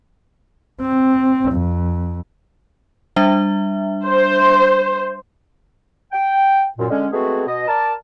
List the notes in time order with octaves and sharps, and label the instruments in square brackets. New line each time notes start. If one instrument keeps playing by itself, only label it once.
[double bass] C4
F2
[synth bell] G3 D4 E5
[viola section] C5
[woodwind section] G5
F#2 A#2
D3 G#3 C#4
G#3 A3 B3 C4 F#4 G#4
B2 D#5
A#4 D5 A5